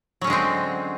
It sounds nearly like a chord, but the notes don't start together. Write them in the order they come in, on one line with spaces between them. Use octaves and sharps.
F#3 C#4 D3 G#3 C4